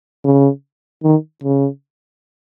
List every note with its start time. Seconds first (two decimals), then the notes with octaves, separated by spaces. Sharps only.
0.25 C#3
1.03 D#3
1.44 C#3